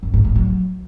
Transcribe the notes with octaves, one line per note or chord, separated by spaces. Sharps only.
F#2
G#2
A2
F#3